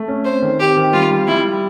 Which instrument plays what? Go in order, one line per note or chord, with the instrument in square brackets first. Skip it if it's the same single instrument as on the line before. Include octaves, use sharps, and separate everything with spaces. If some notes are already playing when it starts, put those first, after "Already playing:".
Already playing: [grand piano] A3
C#4
[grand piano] C4 [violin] C5
[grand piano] D#3
[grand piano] C4 [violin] G4
[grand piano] D#3
[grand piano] G3 [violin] F4
[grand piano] G3
[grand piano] G3 [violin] E4